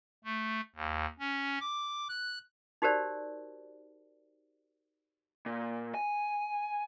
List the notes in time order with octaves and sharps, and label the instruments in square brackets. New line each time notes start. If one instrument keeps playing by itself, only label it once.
[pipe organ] A3
D#2
C#4
D6
F#6
[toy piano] D#4 F#4 G4 A#4 C5 D5
[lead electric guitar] A#2
G#5